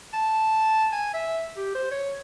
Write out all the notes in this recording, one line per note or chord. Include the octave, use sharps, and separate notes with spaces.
A5
G#5
E5
G4
C5
C#5